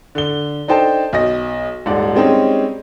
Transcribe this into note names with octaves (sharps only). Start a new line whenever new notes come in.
D3 G7
D4 D#4 A4 C5 G5 A5
B1 D#5 A#6
D#1 G#2 D5 F#5
G3 G#3 C4 C#4 D#4